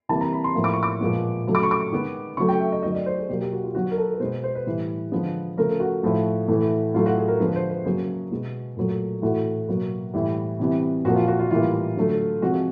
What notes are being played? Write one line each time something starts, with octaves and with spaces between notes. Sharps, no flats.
C3 E3 G3 A#3 A5
A#5
B5
C6
A2 F3 A#3
D6
C#6
D6
A#2 F3 G#3 B3
C#3 F#3 A3
D6
C#6
D6
D#3 G#3 B3
C#3 F#3 A3 C#6
G5
E5
D#5
D#3 F#3 A3 D#5
D5
C5
G#4
B2 F#3 A#3 G4
G4
F#4
F4
D#3 F#3 B3 F#4
A#4
A4
B4
B2 G#3 B3 C5
C5
B4
A2 E3 G3
D3 F3 G#3 B3
C#3 F3 A3 A#4
F#4
A2 F3 A3
A2 E3 A3
A2 F#3 A3 F4
F#4
G#4
A#4
D3 F3 G#3 B3 B4
C5
B4
C#3 F#3 A#3 G#4
B2 G#3 B3
A#2 F#3 A3
A2 E3 A3 F#4
B2 F#3 A#3
A2 E3 G3
C3 E3 G3 B3
A#2 F3 A#3 F#4
F4
F#4
F4
A2 E3 G3 A#3 F4
D3 F#3 A3
C3 F3 G#3 F#4
G#4